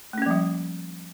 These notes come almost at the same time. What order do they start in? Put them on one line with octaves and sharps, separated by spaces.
A3 C#4 A#3 F3 G3